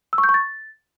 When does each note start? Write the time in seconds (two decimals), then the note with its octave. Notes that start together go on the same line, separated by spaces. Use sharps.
0.13 E6
0.18 C#6
0.24 G6
0.29 C#6
0.34 A6